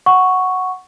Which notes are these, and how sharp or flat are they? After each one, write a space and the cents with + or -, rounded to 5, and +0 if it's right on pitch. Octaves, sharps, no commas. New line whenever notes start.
F#5 +0 C#6 +0